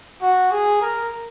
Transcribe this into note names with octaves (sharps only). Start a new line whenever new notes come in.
F#4
G#4
A#4